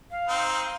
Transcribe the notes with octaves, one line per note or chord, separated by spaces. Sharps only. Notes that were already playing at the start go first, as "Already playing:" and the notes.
F5
C4 D#4